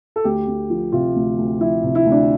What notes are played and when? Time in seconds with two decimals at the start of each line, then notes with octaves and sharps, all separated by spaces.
0.16 A4
0.24 D2 G4
0.48 D2
0.70 F3
0.92 C3 F4
1.16 D2
1.38 D2
1.60 F3 E4
1.83 C3
1.95 E4
2.06 D2
2.12 D4